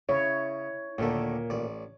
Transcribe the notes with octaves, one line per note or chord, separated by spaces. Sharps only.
C#3 E4 C#5
D#2 A#2 D3 A3 A#3
A1 D5